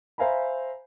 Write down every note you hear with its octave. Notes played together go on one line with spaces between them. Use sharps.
C5 E5 F5 G#5 A#5 B5